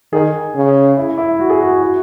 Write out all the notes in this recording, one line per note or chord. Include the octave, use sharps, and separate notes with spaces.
D#3 G#4
C#3
E4
E4
F#4
G#4
F#4
E4
F#4